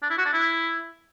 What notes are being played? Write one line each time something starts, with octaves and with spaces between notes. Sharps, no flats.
D4
E4
F#4
D4
E4